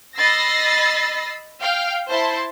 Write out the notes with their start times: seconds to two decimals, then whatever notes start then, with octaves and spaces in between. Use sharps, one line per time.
0.17 D#5 B5 E6 A6 A#6 C7
1.61 F5 G5
2.09 E4 C5 A5 C6